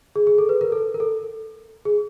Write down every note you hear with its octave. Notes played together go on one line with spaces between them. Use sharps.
G#4
G#4
A4
B4
A#4
A4
A#4
A4
G#4